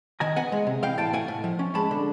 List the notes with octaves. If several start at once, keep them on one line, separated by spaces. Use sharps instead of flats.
D#3 G#5 A#5
B3 F#5 G#5
G#3
C3
E3 F5 G5
A2 G5 A5
A3 F#5 G#5
A2
F3
C#4
G#3 A5 B5
D3